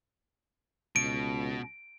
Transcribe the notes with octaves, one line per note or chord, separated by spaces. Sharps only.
C#2 B2 D7